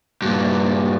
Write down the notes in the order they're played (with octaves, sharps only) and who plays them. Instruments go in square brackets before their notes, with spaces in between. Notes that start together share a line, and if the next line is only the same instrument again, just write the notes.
[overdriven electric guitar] G2 A#2